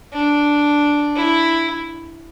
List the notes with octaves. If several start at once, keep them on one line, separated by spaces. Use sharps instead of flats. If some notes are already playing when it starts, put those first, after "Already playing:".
D4
E4